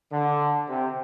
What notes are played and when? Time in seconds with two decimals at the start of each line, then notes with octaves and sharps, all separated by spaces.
0.12 D3
0.69 C3